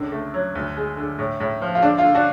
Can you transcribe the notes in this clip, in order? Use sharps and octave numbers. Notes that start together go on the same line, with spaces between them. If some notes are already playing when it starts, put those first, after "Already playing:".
Already playing: C#2 D3
A3
F#3
D2
G#3
D3
A2
A2
F3
F4
D3 D4
F4
D3
D4 F#4